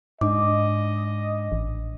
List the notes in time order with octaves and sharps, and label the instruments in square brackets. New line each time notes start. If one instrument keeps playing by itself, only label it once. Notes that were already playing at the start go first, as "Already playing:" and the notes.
[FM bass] G#2 [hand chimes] D4 D6 [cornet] D#5
[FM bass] A1